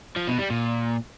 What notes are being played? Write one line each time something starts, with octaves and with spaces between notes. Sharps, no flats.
F3
B2
G3
A#2